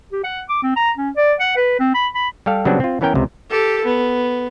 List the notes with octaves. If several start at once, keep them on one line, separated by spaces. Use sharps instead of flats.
G4
F#5
D6
C4
A#5
C#4
D5
F#5
B4
C4
B5
B5
G3 G4 A4 F5
C#3 F#3 G3 B3 C4 D4
C4 F4
E3 B3 C#4 A#4 G5
C#2 C3
G4 A4
B3